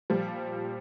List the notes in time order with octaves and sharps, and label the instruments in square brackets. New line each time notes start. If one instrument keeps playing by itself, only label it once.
[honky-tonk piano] A#2 F3 G3